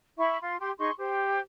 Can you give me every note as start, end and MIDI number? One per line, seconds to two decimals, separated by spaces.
0.18 0.38 64
0.18 0.38 76
0.18 0.38 83
0.18 0.38 85
0.41 0.56 65
0.41 0.56 84
0.59 0.71 67
0.59 0.71 84
0.79 0.91 63
0.79 0.91 68
0.79 0.91 84
0.79 0.91 85
0.99 1.41 67
0.99 1.41 72